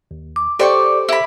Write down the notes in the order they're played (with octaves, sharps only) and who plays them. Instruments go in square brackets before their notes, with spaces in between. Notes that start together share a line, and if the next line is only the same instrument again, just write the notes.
[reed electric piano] D#2
[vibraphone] D6
[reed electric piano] G4 A4 C5 [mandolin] D5 G5 C#6
[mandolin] E4 B5